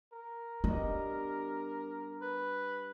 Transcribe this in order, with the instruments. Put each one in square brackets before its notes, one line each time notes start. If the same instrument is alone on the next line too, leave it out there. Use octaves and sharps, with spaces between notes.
[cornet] A#4
[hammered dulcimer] G2 D#5 [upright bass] B3
[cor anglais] B4